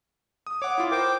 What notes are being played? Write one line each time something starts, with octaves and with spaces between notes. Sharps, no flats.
D#6
C#5 F#5 D6
E4 F4
A#4 C5 G5 D6